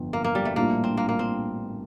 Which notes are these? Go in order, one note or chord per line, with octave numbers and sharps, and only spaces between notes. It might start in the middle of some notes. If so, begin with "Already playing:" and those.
Already playing: G1 F2
A#3
A#3
G3
A3
A#1 A2 G3 A#3 D4 F4
C4
A#3
A#3
C4